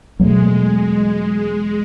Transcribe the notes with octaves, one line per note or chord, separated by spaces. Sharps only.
E2 B2 F#3 G#3 A3